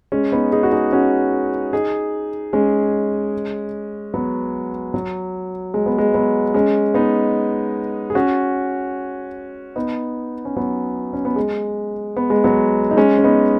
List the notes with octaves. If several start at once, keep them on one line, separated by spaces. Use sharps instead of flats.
G#3 C#4
B3 D#4
D#4 G#4
F#4
D#4 G#4
C#4 F#4
D#4 G#4
G#3 C#4
F#3 B3
F#3
G#3
B3
G#3
F#3 B3
G#3 C#4
B3 D#4
G#4
C#4 F#4
B3 D#4
C#4
F#3 B3
C#4
B3
G#3
B3
G#3
F#3 B3
D#4
G#3 C#4
C#4
B3 D#4